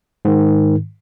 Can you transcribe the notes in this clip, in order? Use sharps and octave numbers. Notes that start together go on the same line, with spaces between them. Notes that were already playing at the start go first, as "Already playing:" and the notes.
G#2 D#3